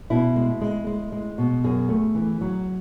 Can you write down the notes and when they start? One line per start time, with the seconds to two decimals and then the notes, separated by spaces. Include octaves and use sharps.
0.10 B2 E4
0.36 G#3
0.61 G#3
0.87 G#3
1.12 G#3
1.38 B2
1.64 F#2 G#4
1.89 A3
2.15 E3
2.41 F#3